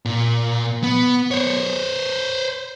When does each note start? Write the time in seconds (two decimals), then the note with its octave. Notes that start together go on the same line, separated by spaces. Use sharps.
0.05 A#2
0.83 B3
1.31 C5 C#5